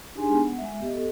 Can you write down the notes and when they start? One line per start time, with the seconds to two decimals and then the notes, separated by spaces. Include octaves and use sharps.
0.15 D4 D#4 G4 G#4 G#5 C6
0.28 G#3 B3
0.45 F#5
0.58 G#3 E5
0.80 B3 G4 D#5
0.93 A4